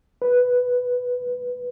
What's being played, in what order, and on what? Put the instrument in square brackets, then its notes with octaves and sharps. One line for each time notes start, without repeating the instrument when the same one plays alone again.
[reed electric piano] B4